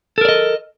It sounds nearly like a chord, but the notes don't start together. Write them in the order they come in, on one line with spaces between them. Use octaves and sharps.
A4 A#4 D5 D#5